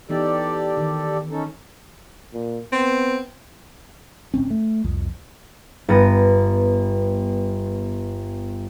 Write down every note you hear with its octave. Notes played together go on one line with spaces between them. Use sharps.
E3 B3 D#4 G4 A4 D5
D#3
C#4 D#4 A4
A#2
B3 C4
D1 C4 C#4
A3
C2 F2
G1 B3 A#6 D#7